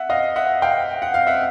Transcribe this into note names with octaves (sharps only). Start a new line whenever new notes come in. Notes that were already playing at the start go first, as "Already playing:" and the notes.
Already playing: E5 F#5
D#5 F5
E5 F#5
F5 G5
F#5
F5
E5 F#5